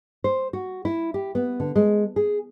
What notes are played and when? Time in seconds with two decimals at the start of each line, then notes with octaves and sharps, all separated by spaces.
0.24 C5
0.53 F#4
0.85 E4
1.14 G4
1.35 B3
1.60 D3
1.76 G#3
2.16 G#4